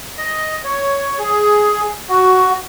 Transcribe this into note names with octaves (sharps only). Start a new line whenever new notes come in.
D#5
C#5
G#4
F#4